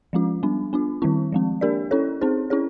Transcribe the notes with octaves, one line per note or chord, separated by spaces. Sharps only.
F3 G#3 C#4 F4
G3 B3 D4
B3 D4 F4
D#3 G3 C4 E4
F3 G#3 C4
A#3 D4 G4 A#4 D5
C#4 E4 A4 C#5
C4 D#4 G#4 C5
C#4 E4 G#4 C#5